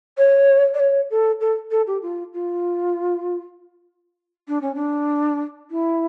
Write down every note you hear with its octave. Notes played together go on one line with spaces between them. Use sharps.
C#5
D5
C#5
A4
A4
A4
G4
F4
F4
D4
C#4
D4
E4